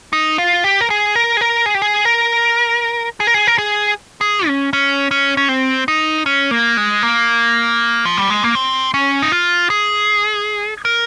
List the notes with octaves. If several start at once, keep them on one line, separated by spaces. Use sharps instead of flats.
D#4
F4
G4
A#4
G#4
A#4
G#4
A#4
G#4
G4
G#4
A#4
G#4
A#4
G#4
A#4
G#4
G#4
C#4
C#4
C#4
C#4
C4
D#4
C#4
A#3
G#3
A#3
F3
G3
G#3
A#3
C4
C#4
D#4
F4
G#4
A#4